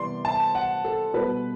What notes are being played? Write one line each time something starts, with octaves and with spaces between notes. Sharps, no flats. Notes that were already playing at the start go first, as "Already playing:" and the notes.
Already playing: C3 E3 G3 B3 D5 C6
A5
F#5
A4
B2 G3 B3 B4